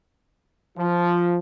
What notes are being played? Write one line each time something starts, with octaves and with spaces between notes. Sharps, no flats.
F3